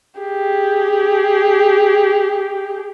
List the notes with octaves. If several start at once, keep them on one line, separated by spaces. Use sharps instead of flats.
G4 G#4